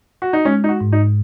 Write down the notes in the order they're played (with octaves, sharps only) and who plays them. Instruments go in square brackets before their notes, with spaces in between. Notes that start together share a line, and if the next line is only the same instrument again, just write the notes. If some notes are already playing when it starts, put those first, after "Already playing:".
[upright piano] F#4
D#4
[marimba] G#3 [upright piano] C#4
[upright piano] D#4
F#4
[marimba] G#2
[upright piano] D#4